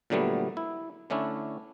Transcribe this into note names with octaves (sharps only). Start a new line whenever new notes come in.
A#2 D3 F#3 G3 A3 B3
E4
D3 A3 C#4 D4 E4